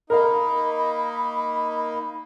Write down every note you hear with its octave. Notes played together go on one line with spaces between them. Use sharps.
A#3 D#4 A#4 F5 B5